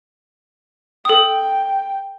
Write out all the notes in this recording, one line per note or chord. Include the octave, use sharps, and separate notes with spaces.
A4 G5 D#6